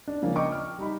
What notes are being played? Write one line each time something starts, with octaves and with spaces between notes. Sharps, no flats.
D4
C#3 F3 A#3 C#4
D#5 G5 C#6 D6
F6
G3 D#4 B5